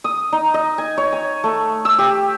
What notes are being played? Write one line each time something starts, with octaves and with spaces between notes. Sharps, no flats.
D#6
D#4
D#5
G#5
C#5
G#5
A3
E6
G4